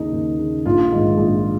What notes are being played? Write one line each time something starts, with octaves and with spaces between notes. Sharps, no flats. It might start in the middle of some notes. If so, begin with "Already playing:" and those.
Already playing: D#2 C#3 D#4
D#2
C#3
A#1 F4
G#2 D#3
A#1